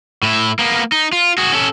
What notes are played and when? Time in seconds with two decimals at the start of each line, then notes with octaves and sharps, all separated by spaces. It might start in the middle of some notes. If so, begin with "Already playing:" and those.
0.23 A2 E4
0.59 A#3 B3
0.92 D#4
1.13 F4
1.38 F#4 G#4
1.53 C#4 A4